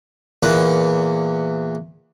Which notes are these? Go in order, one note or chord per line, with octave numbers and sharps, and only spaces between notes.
E2 A#2 B3 B4